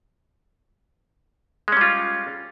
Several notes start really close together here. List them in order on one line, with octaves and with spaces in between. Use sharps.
G#3 C#4 G3 F4